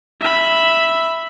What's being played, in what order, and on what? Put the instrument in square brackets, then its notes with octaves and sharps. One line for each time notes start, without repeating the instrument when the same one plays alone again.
[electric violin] E5 B5